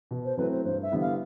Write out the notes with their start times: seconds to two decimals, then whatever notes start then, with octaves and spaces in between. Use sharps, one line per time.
0.11 B2
0.25 C5
0.37 F#3 A3 C4 E4 B4
0.51 C5
0.65 G2 C5
0.83 E5
0.91 D3 G3 B3 E4
1.01 F5